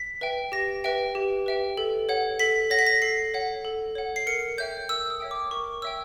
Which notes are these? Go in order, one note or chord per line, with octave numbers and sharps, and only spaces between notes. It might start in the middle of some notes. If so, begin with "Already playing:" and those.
Already playing: B6
B4 E5 G5
G4 A#6
B4 E5 G5
G4
B4 E5 G5
A4
C#5 F#5
A4 B6
C#5 F#5 A#6
B6
A#6
A4 C7
C#5 F#5
A4
C#5 F#5
C7
A#4 C#7
C#5 E5 G5 G6
A#4 E6
D#6
C#5 E5 G5
D6
A#4 C#6
C#5 E5 G5 E6